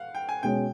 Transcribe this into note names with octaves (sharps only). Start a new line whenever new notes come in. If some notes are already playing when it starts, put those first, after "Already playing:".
Already playing: F5 F#5
G5
G#5
B2 G#3 C#4 G5